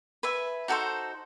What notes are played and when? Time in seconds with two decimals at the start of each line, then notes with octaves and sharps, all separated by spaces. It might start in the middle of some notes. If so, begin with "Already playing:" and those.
0.23 B4 E5 G#5
0.68 D#4 F#4 A4 C5